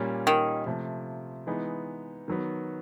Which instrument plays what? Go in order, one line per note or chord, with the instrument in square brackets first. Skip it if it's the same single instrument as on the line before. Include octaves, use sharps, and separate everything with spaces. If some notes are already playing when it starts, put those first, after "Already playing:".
Already playing: [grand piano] A#2 G3 A#3 C#4
[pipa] D#3
[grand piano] C3 F3 A3
E3 G#3 B3 D#4
D#3 F#3 B3